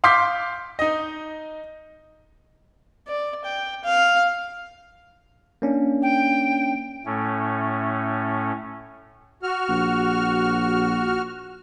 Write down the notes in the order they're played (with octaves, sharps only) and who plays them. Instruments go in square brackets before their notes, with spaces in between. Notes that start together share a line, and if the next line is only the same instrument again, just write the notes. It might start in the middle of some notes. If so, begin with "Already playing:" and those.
[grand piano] F5 C6 D6 G6 B6
D#4 D#5
[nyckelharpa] D5
G5
F5
[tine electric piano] A#3 C#4 D4
[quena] G5
[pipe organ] A2 A3 C#4
[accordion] F#4 F6
[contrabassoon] A#1